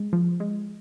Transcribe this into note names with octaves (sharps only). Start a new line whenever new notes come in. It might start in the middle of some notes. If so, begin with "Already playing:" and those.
Already playing: G#3
F3
G#3